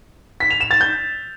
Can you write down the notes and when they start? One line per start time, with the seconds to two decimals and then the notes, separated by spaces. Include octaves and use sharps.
0.40 B6
0.50 F7
0.61 E7
0.71 A6
0.81 G6